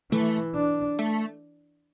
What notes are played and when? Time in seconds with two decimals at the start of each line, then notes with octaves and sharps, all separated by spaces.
0.11 E3 A3
0.55 D4
0.99 A3